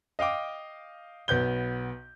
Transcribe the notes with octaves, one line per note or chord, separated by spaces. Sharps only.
D#5 F5 G5 D6
B1 B3 G6 G7